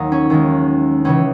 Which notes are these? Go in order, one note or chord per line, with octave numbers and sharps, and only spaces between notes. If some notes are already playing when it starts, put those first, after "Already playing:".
Already playing: D#2 F#3 D#4
C#4
D#2 D#3 G#3
C#2 C#3 E3 C#4